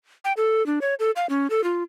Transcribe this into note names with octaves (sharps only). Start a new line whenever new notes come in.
G5
A4
D4
C#5
A4
F5
C#4
A4
F4